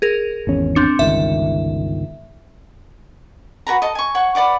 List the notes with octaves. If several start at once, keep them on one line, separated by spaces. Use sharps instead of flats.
G#4 A#4
G#1 E2 C#4
C4 D4 C#7
G1 C#2 D#3 E5
F#4 A#4 B4 A#5
A4 D#5
G#5 C#6
C#5 F#5 C#6
B4 D5 F#5 D6